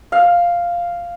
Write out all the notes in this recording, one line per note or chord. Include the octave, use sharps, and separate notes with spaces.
F5